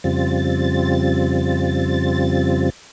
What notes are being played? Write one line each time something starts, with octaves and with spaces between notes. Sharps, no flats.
F2 C#3 G3 C4 F4 A6